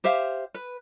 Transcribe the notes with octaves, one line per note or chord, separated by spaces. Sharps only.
G4 C5 E5 F5
B4